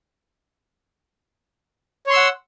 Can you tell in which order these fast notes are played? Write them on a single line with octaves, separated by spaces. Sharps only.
C#5 C6 E6 F#5